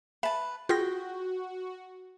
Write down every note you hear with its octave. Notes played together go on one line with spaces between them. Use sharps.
B4 E5 A5
F4 F#4 G#4 G5 A#6